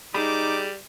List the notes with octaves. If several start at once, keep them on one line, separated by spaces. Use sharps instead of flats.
G3 D#4 G#4 B5 D6